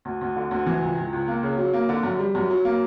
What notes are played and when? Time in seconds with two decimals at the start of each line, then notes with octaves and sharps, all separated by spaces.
0.05 D2
0.21 D2
0.36 D3
0.51 D2
0.67 E3
0.82 C#2
0.97 C#2
1.13 C#2
1.28 A#3
1.43 C#3
1.57 F#3
1.73 A#3
1.89 D3
2.03 F#2
2.19 G3
2.35 F#2
2.50 F#3
2.65 A#3